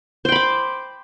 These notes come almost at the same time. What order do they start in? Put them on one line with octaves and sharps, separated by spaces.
C5 G5 B5 D6